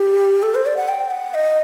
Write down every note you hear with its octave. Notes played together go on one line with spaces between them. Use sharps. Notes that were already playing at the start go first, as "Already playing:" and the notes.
Already playing: G4
A4
C5
D5
F#5
G5
F#5
D#5